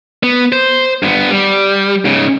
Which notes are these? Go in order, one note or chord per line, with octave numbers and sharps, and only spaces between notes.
B3
C5
G2 B3
G3
G#2 C#3